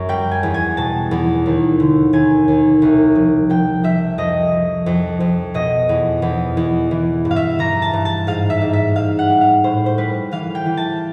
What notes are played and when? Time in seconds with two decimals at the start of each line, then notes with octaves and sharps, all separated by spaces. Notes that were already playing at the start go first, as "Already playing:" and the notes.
Already playing: F#2
0.09 G3 G5
0.31 G#5
0.43 E2
0.54 G#5
0.77 B2 A5
1.11 E2
1.46 D#2
1.80 D3
2.13 D#2 G#5
2.48 D#2
2.82 C2
3.15 F3
3.50 F3 G5
3.84 F3 E5
4.18 F2 D#5
4.52 F3
4.86 F2
5.20 F2
5.54 B2 D#5
5.89 E2
6.22 E2
6.57 E2
6.91 E3
7.25 G2
7.31 F5
7.36 E5
7.59 E3 A#5
7.82 A5
7.93 G2
8.05 A5
8.27 G#2 F5
8.50 E5
8.62 G#2
8.73 E5
8.96 G#2 F5
9.19 F#5
9.30 G3
9.41 F5
9.64 A2 C5
9.86 C5
9.98 G3 B4
10.32 E3 F5
10.55 G5
10.66 E3
10.77 A5